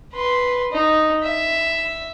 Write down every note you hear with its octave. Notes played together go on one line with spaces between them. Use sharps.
B4 C6
D#4
E5